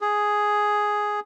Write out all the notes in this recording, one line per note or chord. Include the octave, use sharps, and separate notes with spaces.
G#4